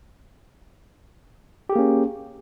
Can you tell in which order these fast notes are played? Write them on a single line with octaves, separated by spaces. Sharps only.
G4 G#4 A#3 C#4